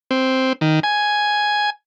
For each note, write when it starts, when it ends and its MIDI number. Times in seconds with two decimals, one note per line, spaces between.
0.11 0.53 60
0.61 0.80 51
0.83 1.70 80